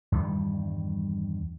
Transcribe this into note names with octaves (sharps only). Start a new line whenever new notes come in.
E2 G2 D#3 G3